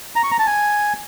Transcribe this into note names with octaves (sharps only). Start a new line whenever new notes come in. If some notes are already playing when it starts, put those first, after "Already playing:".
A#5
C#6
A#5
A5
G#5